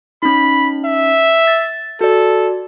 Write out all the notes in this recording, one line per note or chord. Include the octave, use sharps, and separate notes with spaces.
C#4 D#4 B5
E5
A6
F#4 A4 D5